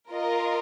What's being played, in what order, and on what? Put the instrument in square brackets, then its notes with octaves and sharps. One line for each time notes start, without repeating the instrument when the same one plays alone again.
[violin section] F4 A#4 D#5